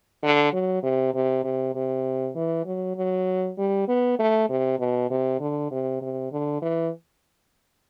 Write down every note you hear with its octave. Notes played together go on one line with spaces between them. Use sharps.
D3
F#3
C3
C3
C3
C3
E3
F#3
F#3
G3
B3
A3
C3
B2
C3
D3
C3
C3
D3
E3